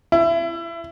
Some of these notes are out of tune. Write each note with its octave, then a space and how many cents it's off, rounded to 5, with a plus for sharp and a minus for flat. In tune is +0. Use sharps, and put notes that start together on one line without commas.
E4 +25